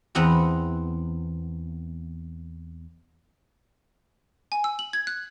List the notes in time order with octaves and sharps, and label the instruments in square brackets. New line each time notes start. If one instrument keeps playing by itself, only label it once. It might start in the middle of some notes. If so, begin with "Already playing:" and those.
[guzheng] E2 B3 C4 F#5 A#5
[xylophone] G#5
E6
F#7
G#6
F#6